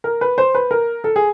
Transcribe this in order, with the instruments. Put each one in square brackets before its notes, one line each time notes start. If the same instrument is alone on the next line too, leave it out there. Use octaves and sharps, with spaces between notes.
[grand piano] A#4
B4
C5
B4
A#4
A4
G#4